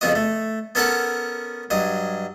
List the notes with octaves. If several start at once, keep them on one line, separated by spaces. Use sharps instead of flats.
F2 C#3 B3 F#4 D#5
A3
B3 C#4 A4 A#4 C#5 F#5
G2 F#3 D#5